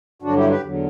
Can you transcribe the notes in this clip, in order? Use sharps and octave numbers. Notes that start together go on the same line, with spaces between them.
G2 D3 F#3 D4 F#4
E4 G4
G4 B4
E2 D3 F#3